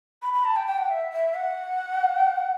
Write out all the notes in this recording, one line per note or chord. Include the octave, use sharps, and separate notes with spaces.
B5
B5
A5
G5
G5
F#5
E5
E5
F#5